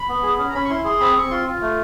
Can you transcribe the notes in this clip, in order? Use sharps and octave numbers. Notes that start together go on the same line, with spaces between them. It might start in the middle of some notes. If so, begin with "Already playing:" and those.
Already playing: B5
B3
G#4
C#4
A#5
C#4 B5
C#6
E4 C6
G#4 C6
C4 B5
C4 C#6
F4 C6
F4
A3